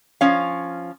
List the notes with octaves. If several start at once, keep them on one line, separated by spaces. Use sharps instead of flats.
F3 C#4 F5